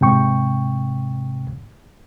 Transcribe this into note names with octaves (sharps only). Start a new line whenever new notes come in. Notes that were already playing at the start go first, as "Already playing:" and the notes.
G#2 C3 G5 C#6